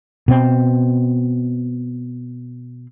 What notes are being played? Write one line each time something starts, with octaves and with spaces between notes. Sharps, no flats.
B2 C4